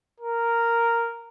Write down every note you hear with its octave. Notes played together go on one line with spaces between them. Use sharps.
A#4